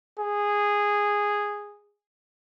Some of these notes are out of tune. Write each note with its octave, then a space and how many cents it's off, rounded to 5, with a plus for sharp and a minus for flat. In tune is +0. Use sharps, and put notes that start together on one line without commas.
G#4 -10